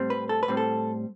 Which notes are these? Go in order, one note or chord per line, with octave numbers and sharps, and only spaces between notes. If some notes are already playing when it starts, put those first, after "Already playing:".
Already playing: A2 G3 C4
B4
A4
B4
A2 G3 C4
A4